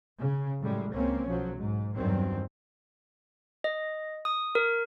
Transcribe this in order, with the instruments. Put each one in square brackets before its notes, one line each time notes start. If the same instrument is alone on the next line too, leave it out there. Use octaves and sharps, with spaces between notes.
[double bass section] C#3
F#2 A2 G3 G#3
C#2 A#3 C4 C#4
B1 F3 F#3
G#2
E2 G2 D#3 F#3 C4
[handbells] D#5
D#6
A#4